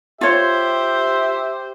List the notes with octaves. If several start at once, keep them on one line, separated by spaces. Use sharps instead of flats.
F4 G4 C5 C#5 E5